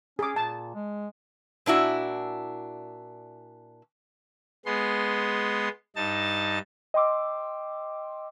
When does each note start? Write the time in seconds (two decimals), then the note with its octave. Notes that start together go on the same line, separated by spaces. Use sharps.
0.19 C#4 G#4 D6
0.36 A#2 A5
0.74 G#3
1.66 A#2 D4 E4 F#4
4.65 G#3 B3 C6
5.96 G2 D#4 A5 A6
6.94 D#5 G5 C6 D6 E6